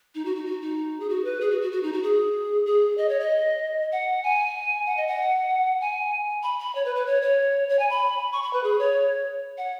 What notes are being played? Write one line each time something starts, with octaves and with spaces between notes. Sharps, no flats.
D#4
F#4
D#4
F#4
D#4
G#4
F#4
B4
G#4
F#4
F#4
F#4
D#4
F#4
G#4
G#4
D#5
C#5
D#5
F#5
G#5
F#5
D#5
F#5
G#5
B5
B5
C#5
B4
B4
C#5
C#5
C#5
G#5
B5
C#6
B5
B4
G#4
C#5
F#5